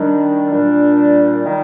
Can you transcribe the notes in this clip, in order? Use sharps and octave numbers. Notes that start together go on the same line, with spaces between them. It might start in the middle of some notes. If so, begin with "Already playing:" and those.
Already playing: D#3 G3 D4
A#2 G3 D4
D#3 G3